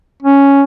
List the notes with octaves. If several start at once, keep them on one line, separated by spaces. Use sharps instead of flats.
C#4